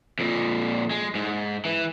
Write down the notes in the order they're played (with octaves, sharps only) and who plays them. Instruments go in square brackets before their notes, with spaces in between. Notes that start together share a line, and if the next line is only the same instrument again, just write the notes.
[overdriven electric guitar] F2 A#2
G#3
G#2
E3